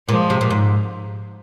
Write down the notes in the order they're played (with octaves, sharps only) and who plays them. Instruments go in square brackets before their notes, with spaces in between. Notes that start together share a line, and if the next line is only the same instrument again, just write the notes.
[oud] A#2 [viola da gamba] F3 G#3
[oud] C3
A#2
G#2